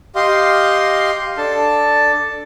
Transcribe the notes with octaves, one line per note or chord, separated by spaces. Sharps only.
G4 D#5 F5 C6
D4 A4 A5